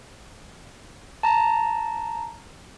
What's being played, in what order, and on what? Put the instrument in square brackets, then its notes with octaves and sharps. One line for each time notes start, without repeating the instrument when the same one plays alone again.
[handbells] A5 A#5